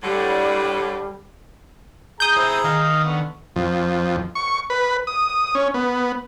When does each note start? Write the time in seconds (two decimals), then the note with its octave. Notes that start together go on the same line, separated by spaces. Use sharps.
0.03 A2 D3 G3
2.20 G#4 A#5 D#6 G6
2.37 E4 C5 E5
2.64 D#3 D#5 F5
3.04 D3 B3 C#6
3.56 F2
4.35 C#6
4.70 B4
5.07 D#6
5.55 C#4
5.74 B3